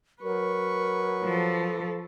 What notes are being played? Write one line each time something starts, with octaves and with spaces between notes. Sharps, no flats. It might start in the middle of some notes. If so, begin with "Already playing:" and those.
F#3 A#4 B4 C#6
F3 A4